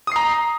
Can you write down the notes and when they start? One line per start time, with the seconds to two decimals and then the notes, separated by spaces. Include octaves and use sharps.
0.07 D#6
0.12 C7
0.16 A#5